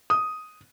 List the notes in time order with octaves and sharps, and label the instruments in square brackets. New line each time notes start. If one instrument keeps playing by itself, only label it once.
[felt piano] D#6